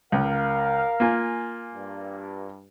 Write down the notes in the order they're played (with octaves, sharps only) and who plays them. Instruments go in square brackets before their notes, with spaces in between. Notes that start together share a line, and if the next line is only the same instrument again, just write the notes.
[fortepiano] C#2 [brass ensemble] A#4 F5
[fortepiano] A#3 F4 G#5
[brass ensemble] G2